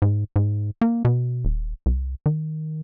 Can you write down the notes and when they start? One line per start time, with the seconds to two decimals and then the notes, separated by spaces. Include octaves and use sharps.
0.02 G#2
0.36 G#2
0.81 A#3
1.05 B2
1.45 D#1
1.86 C2
2.26 D#3